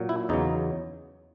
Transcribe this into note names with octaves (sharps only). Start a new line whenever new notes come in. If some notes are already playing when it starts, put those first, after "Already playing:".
Already playing: A#2 F#3
E4
E2 C#3 F#3 D#4